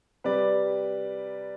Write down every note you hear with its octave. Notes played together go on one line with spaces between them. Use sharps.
C3 G3 B4 D5